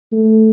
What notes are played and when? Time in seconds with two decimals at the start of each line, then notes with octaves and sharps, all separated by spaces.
0.12 A3